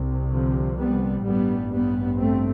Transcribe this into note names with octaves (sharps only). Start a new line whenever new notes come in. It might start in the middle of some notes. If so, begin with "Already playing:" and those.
Already playing: C2 C3
D3 F3
G3 B3
A1 G2 G3 B3
G3 B3
A3 C4